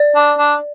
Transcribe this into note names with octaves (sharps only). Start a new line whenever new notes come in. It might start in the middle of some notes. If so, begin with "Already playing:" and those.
Already playing: D5
D4
D4